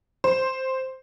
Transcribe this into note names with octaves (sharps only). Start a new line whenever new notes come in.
C5